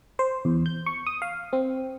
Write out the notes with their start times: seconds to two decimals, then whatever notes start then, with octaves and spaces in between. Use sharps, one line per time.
0.19 C5
0.45 E2
0.66 G6
0.86 C#6
1.06 D#6
1.22 F5
1.53 C4